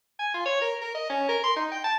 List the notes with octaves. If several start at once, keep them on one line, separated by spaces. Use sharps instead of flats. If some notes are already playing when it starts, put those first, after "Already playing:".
G#5
F4
C#5
A#4
A#4
D#5
C#4
A#4
C6
D#4
G5
A5